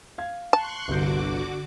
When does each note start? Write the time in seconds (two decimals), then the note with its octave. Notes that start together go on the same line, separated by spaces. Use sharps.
0.18 F5 G#6
0.53 A5 C6 C#6 F#6
0.88 G1 C2 D3 F#4 D6 G6